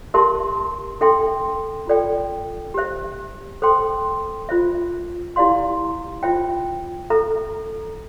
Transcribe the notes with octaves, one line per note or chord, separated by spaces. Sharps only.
G4 A#4 E5 A5 C6
D4 A4 E5 G5 C6
F4 A4 D5 G5
G4 C5 E5
A4 C5 G5 C6
F4 C5 E5
E4 G4 D5 F5 C6
F4 C5 E5 G5
A4 E5 A#5